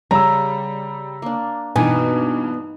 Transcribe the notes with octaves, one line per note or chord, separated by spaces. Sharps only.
C#3 G3 A#5 E6
A#3 D4
G2 B2 E3 D#4 G#5